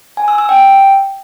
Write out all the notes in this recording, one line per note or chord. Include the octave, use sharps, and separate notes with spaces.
G#5
E6
E6
G5